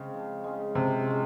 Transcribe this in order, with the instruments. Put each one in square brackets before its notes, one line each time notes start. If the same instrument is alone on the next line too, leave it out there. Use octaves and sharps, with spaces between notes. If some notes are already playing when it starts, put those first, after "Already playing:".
Already playing: [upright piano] C#3 [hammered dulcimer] G#3 C4
[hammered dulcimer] F3
G#3 C#4 F4
[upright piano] C3 [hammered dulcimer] F3
[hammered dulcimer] G#3 C#4 F4